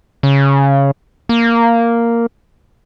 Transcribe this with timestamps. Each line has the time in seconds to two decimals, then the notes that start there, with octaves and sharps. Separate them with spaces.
0.23 C#3
1.29 A#3